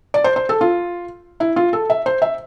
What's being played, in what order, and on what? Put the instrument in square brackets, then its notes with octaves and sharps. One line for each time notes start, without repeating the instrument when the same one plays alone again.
[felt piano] D5
C5
C5
A4
F4
E4
F4
A4
E5
C5
E5